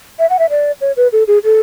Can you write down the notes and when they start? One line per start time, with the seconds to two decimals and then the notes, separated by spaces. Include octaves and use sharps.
0.19 E5
0.30 F#5
0.39 E5
0.50 D5
0.81 C#5
0.97 B4
1.12 A4
1.27 G#4
1.44 A4